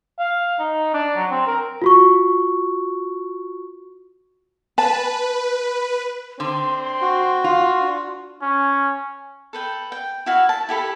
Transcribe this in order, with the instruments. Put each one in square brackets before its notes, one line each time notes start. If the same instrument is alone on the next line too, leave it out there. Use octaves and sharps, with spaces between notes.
[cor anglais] F5
D#4
D4
F#3
C4
A#4
[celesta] F4 F#4 C#6
[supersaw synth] B4 [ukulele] A5
[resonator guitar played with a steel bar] D3 [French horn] C4 [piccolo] C6
[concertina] F#4
[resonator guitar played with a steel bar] F4
[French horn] D4
[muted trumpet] C#4
[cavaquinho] A4 B4 G5
G5
E4 F#4 F5
A5
E4 G4 A4 B5